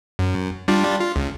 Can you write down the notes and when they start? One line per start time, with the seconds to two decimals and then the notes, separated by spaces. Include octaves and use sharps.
0.19 F#2
0.68 G3 D4 F4
1.00 F4
1.16 C#2